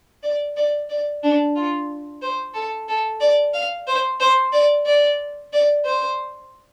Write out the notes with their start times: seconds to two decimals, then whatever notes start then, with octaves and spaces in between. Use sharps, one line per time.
0.23 D5
0.57 D5
0.90 D5
1.23 D4
1.55 F4
2.22 C5
2.54 A4
2.88 A4
3.20 D5
3.54 F5
3.87 C5
4.20 C5
4.52 D5
4.86 D5
5.53 D5
5.85 C5